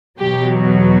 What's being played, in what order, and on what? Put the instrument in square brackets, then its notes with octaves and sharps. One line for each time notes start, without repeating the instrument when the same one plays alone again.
[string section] E2 B2 F#3 G4